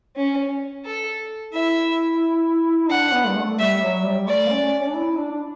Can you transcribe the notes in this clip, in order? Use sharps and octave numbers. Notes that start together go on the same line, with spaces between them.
C#4
A4
E4 E5
D4 F#5
B3
G3
A3
G3 E5
F#3
G3
A3 D5
C#4
C#4
D4
E4
D4
D4